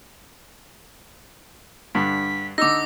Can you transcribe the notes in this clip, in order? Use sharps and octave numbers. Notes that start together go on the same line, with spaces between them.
G2 D3 B6
D3 D#4 D6 E6 A#6